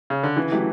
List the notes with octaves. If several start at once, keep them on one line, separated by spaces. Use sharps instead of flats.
C#3
D3
C#3 E3
F#3 A3 E4 G4